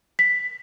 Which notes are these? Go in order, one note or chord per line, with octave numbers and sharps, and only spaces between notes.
B6